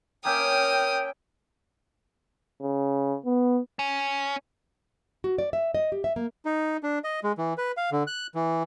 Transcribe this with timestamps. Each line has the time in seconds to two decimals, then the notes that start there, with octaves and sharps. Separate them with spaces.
0.25 A#3 C#4 A#4 E5 G5 D#6 F6
2.62 C#3
3.26 B3
3.79 C#4
5.24 F#4
5.38 D5
5.53 E5
5.75 D#5
5.92 G4
6.04 E5
6.16 A#3
6.45 D#4
6.83 D4
7.04 D#5
7.24 G#3
7.38 E3
7.58 B4
7.77 F5
7.92 D3
8.07 F#6
8.35 E3